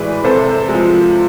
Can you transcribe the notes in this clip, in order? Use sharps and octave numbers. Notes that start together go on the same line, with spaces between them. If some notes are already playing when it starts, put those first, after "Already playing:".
Already playing: A2 E3 G#3 B4 D5
C3 A4 C5
G#3
F3